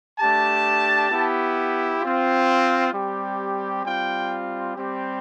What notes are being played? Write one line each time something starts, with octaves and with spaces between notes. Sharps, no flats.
A3 D4 G4 A5
B3 E4 G4
C4 F4
G3 C4 G4
G3 C4 F4 G5
G3 C4 G4